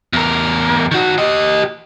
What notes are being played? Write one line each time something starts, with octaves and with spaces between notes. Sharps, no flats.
E2 A#4
D#3 F#4
G4 D#5